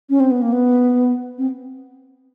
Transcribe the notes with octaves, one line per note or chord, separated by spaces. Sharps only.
C#4
C4
B3
A#3
B3
C4